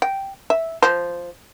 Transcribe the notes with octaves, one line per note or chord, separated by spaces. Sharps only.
G5
E5
F3 C5